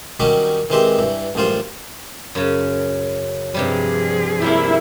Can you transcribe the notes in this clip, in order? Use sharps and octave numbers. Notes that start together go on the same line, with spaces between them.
D#3 F#3 G3 C#4 D#4 G4
D#3 E3 G#3 C4 G4 C5
G2 E3
A1 F#2 G3 F4 C5
F#2 C#3
G2 C3 F3 G3 G#4
C3 G3 A#3 E4